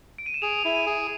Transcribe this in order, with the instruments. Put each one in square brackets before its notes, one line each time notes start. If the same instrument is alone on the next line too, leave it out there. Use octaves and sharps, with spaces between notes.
[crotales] D7
D#7
E7
[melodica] G#4 [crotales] F7
[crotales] F7
[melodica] E4
[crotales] D#7
[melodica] G#4
[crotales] D#7